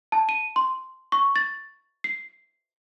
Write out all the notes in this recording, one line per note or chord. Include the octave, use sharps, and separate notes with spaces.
A5
D#7
C6
C#6
A6
C7